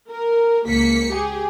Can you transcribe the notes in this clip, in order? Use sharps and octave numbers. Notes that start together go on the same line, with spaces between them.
A#4
C#2 A#3 B6 C#7
G4 G#4